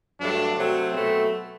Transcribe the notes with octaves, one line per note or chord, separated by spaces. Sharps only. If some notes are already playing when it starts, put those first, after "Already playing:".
G2 F#3 A3 D4
C3 F#3 A3 C4
B2 F#3 A3